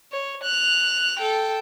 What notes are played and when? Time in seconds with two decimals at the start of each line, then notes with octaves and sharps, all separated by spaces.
0.12 C#5
0.43 F#6 F7
1.19 A4 G5